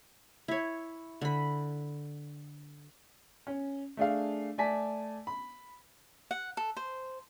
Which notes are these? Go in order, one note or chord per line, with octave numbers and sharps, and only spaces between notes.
E4 C#5
D3 B5
C#4
A3 D4 G#4 F5
A3 D5 G#5 A5 B6
B5
F#5
A4
C5